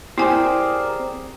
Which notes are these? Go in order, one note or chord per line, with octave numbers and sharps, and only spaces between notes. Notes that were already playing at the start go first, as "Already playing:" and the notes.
C4 E4 G4 G#4 A#4 D5 G#5